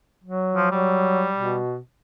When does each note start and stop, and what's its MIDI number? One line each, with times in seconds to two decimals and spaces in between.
0.24 0.70 54
0.56 0.70 53
0.72 1.28 54
0.72 1.58 55
1.37 1.78 47